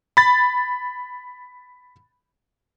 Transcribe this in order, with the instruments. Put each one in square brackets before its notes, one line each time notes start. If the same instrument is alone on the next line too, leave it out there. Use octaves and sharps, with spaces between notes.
[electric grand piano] B5 A6